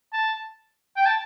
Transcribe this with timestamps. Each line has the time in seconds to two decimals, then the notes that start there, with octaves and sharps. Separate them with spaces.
0.13 A5
0.97 G5
1.06 A5